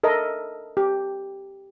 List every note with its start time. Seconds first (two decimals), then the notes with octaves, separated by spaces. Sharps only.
0.04 A4 A#4 D#5 E5
0.77 G4